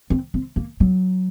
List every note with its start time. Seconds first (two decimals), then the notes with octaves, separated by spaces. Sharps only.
0.10 C4
0.34 C4
0.56 A#3
0.80 F#3